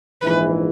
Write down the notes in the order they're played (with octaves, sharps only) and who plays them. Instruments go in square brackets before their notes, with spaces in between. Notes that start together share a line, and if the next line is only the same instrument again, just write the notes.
[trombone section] A#1 G#2 E3 [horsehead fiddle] B4